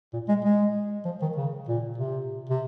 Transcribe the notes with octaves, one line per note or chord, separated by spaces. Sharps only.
A#2
G#3
G#3
F3
D#3
C#3
A#2
C3
C3